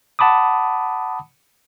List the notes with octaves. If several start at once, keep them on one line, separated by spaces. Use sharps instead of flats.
F#5 A5 B5 D6 D#6